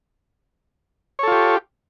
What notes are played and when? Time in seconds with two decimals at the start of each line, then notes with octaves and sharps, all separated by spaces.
1.19 C#5
1.23 A4
1.28 F4
1.32 G4